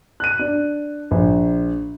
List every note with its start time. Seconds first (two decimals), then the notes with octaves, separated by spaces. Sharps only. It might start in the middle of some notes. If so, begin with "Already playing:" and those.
0.20 F#6 D#7
0.39 D4
1.11 A#1